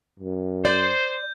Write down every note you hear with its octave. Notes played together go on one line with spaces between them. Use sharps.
F#2
C5 D5 G6